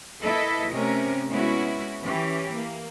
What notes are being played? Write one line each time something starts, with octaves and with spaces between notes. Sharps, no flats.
A#3 E4 A4 B4 D#5
C3 A3 C#4 A#4
G#3 B3 C#4 E4 F#4
E3 C#4 G4
A#3